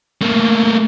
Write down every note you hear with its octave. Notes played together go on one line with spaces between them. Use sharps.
A3 A#3